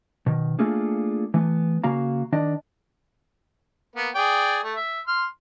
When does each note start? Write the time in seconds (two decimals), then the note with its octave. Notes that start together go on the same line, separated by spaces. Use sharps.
0.26 B2 D#3
0.59 A3 A#3 D4 F4 G#4 A4
1.34 E3 A3 B3
1.84 C#3 A#3 F#4 F5 A#5
2.32 D#3 D4 D5 D#5
3.96 A#3 B3
4.15 G#4 D5 G5
4.64 A3
4.76 E5
5.07 C6 F6